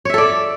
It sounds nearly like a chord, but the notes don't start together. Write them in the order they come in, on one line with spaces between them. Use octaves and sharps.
C#5 E5 A4 D5